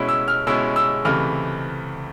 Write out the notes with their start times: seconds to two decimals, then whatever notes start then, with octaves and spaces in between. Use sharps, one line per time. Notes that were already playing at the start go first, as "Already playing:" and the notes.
Already playing: B2 G#3 C#4 E4
0.09 E6
0.28 F6
0.47 B2 G#3 C#4 E4 E6
0.76 E6
1.05 C#2 C3 E3 A3 F6